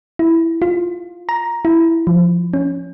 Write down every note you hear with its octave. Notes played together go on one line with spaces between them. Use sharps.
E4
F4
A#5
E4
F3
C#4